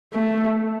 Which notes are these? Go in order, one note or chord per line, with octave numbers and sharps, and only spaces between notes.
A3